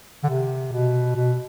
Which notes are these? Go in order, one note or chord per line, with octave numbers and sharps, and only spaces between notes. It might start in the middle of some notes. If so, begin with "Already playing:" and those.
D3
C3
B2
B2